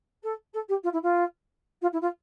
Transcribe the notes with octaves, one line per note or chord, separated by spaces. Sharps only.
A4
A4
G4
F4
E4
F4
F4
E4
F4